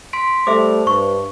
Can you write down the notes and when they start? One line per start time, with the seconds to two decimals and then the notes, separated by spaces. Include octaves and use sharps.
0.13 C6 B6 D7
0.47 G3 A3 A4 C5 E5 D6
0.87 G2 C#6